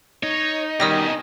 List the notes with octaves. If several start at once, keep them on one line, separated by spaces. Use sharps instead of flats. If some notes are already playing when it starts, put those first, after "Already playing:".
D#4 C#5
B2 D#3 G3 C#4 G4 D#5 D#6 A#6